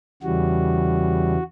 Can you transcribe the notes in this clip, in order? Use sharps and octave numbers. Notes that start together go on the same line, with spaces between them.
E2 C#3 E3 G3 F#4